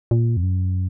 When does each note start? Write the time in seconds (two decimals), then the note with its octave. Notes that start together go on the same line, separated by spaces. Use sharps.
0.11 A#2
0.37 F2
0.43 F#2